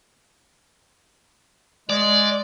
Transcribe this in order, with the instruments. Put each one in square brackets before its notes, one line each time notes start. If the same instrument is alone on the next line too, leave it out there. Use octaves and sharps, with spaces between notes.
[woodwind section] G#3 [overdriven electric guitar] D5